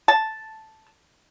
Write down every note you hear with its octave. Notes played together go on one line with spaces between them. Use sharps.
A5